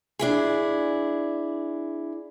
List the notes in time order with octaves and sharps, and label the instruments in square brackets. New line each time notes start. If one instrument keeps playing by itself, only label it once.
[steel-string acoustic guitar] D4 E4 G#4